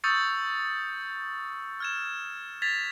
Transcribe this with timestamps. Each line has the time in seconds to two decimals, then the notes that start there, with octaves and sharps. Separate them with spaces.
0.04 C#6 D#6 E6 G6 A6 C#7
1.80 F6 G#6 E7
2.62 G#6 A6 B6 F7